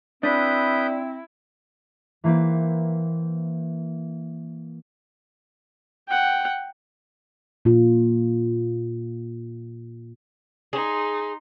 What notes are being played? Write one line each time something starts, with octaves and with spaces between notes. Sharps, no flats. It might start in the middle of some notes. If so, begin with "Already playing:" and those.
C4 D4 E4 B4 D#6 G6
E3 A#3 C4 E4 B4
F#5 G5
A#2 F4
D#4 G#4 C6